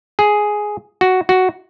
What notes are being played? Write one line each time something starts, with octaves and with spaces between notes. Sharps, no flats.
G#4
F#4
F#4